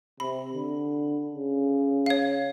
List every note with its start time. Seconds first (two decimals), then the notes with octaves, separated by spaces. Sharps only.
0.20 C3 B5
0.54 D3
1.32 C#3
2.06 C#5 F5